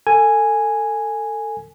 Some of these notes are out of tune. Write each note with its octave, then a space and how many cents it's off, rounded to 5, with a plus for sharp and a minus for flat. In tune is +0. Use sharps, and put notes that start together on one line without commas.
A4 +25 G#5 +0